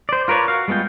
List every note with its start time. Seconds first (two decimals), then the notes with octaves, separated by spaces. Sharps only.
0.09 C5 D5
0.28 F4 A#4 B4 C#5 D5
0.48 F#4 F5
0.68 G3 G#3 B3 F4 G5